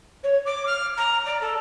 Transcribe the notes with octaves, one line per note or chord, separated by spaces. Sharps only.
C#5
D6
F6
A#5
D5
A4